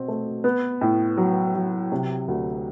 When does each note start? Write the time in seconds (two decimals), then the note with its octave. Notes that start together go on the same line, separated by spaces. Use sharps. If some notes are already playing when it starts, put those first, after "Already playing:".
Already playing: B2 C4
0.08 A3
0.44 B3
0.81 A2
1.17 F#3
1.55 F#3
1.92 C3
2.28 D2